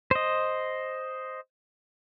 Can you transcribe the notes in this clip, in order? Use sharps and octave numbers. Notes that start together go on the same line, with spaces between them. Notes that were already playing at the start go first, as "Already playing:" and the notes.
C5 D#5